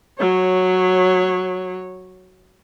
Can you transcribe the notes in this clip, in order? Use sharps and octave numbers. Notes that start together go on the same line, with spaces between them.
F#3 C#5